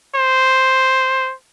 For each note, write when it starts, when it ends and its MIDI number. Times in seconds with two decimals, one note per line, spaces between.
0.15 1.33 72